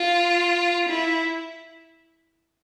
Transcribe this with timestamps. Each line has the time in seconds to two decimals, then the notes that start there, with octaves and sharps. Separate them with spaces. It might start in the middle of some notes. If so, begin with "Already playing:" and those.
Already playing: F4
0.89 E4